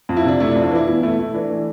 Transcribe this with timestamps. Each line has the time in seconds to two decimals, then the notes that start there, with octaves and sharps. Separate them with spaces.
0.09 F2
0.17 E4
0.24 C3 D4
0.40 A3 E4
0.51 D4
0.55 F2
0.64 D4
0.71 E3 E4
0.87 B2 E4
1.03 A3 E4
1.19 A3 E4
1.34 E3 D4
1.50 A3